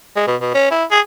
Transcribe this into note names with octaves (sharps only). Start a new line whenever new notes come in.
G#3
B2
B2
C#4
E4
G#4